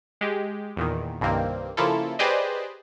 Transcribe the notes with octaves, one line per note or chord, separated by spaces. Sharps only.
G#3 G4
E2 A#2 D#3
C2 G2 D#3 A#3 C4
C#3 F3 A#3 E4 F4 A4
G4 G#4 B4 C5 D5 D#5